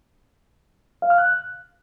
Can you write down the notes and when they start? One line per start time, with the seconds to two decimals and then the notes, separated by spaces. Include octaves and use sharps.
1.02 F5
1.10 F6
1.18 F#6